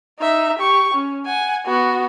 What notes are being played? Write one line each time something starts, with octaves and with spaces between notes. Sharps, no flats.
D#4 E5
G4 C#6
C#4
F#5 G#5
B3 F#4